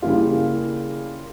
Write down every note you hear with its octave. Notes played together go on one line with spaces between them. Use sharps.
C#3 G3 A#3 E4 F4